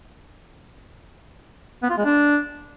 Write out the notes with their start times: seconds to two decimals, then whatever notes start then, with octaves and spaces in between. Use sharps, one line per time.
1.83 B3
1.90 F4
1.97 G#3
2.05 D4